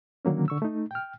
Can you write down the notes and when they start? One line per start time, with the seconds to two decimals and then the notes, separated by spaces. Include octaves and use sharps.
0.25 D3 D#3 F#3 A#3 C#4
0.48 D3 C#6 E6
0.62 A3 D#4
0.91 G5 F6